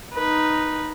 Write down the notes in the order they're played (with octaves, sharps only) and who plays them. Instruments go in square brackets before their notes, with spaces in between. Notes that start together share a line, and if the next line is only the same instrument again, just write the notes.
[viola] D#4 B4